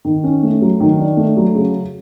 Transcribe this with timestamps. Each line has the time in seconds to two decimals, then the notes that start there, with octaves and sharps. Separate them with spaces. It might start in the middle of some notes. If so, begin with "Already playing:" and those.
0.05 D#3
0.24 C#4
0.43 A3
0.62 F#3
0.80 D#3
0.99 D4
1.17 A3
1.37 F#3
1.55 C#3